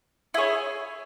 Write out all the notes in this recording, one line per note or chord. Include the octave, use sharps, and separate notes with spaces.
E4 G#4 C#5